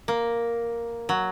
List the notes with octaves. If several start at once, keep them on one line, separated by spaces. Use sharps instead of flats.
A#3
F#3